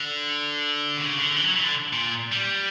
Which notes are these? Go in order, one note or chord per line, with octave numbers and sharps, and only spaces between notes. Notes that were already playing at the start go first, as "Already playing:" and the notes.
Already playing: D3
C#3
D3
E3
F#3
E3
D3
A#2
G3